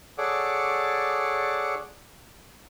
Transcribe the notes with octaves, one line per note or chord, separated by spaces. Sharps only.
G#4 A4 C#5 D5 F#5 D6